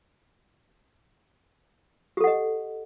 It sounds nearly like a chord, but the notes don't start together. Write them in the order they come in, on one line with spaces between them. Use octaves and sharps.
G4 A4 F#5 D#5